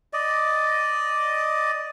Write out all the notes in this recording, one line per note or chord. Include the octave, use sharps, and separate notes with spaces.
D5 D#5